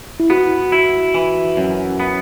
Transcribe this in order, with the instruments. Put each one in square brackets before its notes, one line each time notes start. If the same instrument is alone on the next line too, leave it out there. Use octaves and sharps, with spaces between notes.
[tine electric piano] E4
[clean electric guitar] B3 [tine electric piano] F#4
[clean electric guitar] E4 [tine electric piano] F#4
[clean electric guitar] E3
F#2
B3